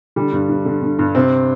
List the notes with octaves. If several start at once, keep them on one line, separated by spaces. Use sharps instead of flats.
D3 G3
G2
G2
D3
D3
G2
C3 C4